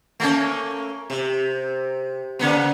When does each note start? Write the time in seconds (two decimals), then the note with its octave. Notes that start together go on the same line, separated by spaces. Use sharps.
0.20 A3 A#3 C#4
1.10 C3
2.39 C#3 A#3 B3